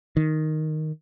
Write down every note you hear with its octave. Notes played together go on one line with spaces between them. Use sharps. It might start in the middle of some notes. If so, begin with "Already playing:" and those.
D#3